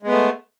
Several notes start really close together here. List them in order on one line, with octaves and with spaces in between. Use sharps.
G#3 B3 A3